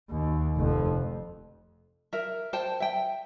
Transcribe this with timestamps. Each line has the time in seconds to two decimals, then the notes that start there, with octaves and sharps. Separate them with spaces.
0.11 D#2
0.56 F1 F2
2.13 A#4 E5
2.53 C5 G5 A5
2.80 E5 G5